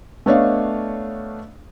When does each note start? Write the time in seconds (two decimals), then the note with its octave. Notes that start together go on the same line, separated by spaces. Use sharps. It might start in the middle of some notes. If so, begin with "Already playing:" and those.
0.26 A3 B3 D4 C#5 D#5 F5